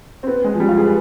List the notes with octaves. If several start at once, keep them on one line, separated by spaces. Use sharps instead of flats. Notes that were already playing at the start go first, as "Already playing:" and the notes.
C4
B3
G#3
F3
G3
F4
G#4
B4